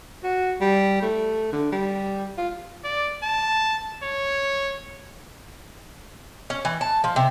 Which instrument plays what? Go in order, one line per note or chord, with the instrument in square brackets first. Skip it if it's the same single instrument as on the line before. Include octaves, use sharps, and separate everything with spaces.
[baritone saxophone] F#4
G3
A3
D3
G3
F4
[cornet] D5
A5
C#5
[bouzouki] C#4
E3
A5
F3
C3